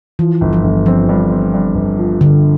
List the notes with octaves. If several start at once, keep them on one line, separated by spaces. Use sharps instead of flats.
E3 F3
G1
F3
G1
F3 C4
G2
C4
G2
G1
F3
G1 D3